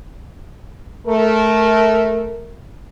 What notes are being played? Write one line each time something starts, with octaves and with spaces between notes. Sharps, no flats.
A3 A#4